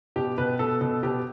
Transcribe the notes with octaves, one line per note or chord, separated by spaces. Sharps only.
B2 G4
B2 B4
B2 A4
B2 A4
B2 G4